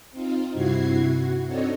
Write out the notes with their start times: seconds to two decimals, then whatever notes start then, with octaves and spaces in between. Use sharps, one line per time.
0.12 C4 D#4 F4
0.54 G2 C3 E4 F#4 G#6 C7
1.01 F#4
1.45 C4 D4 D#4 A4 C#5 D#5